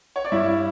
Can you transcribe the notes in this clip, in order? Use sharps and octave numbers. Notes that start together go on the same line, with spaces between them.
C#5
D5
G2 E4 E5